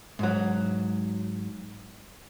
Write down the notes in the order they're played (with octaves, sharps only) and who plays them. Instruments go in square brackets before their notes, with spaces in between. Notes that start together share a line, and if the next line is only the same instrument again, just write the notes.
[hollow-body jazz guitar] G#2 F#3